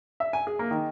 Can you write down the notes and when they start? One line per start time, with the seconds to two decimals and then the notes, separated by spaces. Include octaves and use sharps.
0.20 E5
0.33 G#5
0.47 G#4
0.59 A#3
0.71 D#3